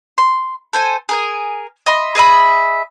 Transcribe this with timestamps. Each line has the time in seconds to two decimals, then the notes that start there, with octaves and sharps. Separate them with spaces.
0.18 C6
0.73 A4 C5 G#5
1.09 G#4 A#4 G#5
1.86 D#5 E5 B5 C6
2.15 G#4 D#5 E5 B5